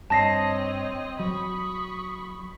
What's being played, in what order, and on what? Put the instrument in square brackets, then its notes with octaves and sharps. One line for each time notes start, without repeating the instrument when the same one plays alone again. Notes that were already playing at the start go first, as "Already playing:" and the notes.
[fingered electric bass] G2 [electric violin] C4 D#5 [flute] C#5 [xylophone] A5 A#6 C7
[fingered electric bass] F#3 [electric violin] B5 C#6 [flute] D#6